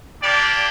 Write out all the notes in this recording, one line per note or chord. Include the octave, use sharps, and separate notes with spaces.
A#3 D4 G4 D5